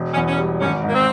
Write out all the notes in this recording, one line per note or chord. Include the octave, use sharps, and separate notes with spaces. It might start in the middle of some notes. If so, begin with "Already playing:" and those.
Already playing: E1
C#4
E2
C#4
G3
G#1 C#4
G#2
A#3
C4